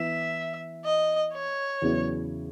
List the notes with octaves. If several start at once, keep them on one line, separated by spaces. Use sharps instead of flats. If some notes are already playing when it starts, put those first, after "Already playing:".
Already playing: E3 B3 E4 E5
D#5
C#5
E2 C#3 F#3 B3 E4